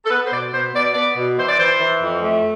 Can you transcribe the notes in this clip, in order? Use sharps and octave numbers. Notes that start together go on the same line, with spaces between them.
A4
B3 B4
C5
B2 D5
B2 C5
B2 D5
B3 D5
B2
E3 C5
D5
E3 C5
E3
F2
A3